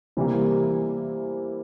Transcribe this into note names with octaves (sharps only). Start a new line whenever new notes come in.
C3 E3 G3 A#3